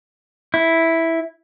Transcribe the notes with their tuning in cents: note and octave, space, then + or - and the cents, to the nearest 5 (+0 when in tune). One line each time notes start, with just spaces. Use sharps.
E4 -5